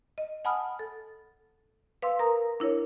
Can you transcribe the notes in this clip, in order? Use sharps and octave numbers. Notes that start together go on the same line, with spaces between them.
D#5
F#5 G#5 A5 B5 D#6 F6
A4
B4 F5 C6 E6
A#4 A#5 D#6
D4 E4 A#4 C#5